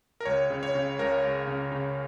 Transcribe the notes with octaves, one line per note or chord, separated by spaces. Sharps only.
A#4
C#2 C#5
C#3
C#5
C#3
C#2 A#4
C#2
C#3
C#3